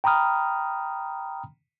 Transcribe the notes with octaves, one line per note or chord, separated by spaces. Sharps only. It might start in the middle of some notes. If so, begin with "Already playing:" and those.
G5 A#5 B5 D#6 F6